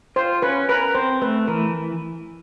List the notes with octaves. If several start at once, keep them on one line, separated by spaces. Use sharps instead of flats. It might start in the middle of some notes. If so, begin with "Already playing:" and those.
F4 C5
C#4 B4
A#4 B4
C4 C5
A3 B4
E3 A#4